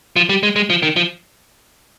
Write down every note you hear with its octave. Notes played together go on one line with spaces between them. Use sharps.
F3
G3
G#3
G#3
F3
D#3
F3